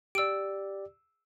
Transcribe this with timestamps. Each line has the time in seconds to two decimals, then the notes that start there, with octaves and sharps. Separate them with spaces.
0.15 G4 D5 E6 D7